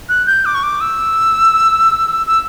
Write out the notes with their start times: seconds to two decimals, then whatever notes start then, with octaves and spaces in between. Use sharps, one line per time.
0.09 F#6
0.27 G6
0.46 D6
0.55 C#6
0.63 D6
0.81 E6
2.27 E6